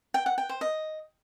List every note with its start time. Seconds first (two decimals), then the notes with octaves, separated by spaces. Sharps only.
0.14 G5
0.26 F#5
0.38 G5
0.49 C5
0.61 D#5